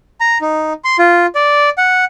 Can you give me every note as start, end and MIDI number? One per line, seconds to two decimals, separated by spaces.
0.21 0.38 82
0.41 0.73 63
0.84 0.97 84
0.99 1.26 65
1.35 1.70 74
1.78 2.05 78